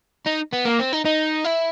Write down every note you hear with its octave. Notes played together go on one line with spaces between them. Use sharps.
D#4
B3
A#3
C4
D#4
D#4
E4